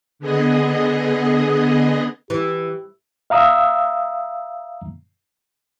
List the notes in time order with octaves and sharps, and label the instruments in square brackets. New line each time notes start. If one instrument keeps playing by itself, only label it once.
[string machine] D3 B3 G#4 D#5
[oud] E3 [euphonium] G4
[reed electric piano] E5 F5 A#5 D#6 E6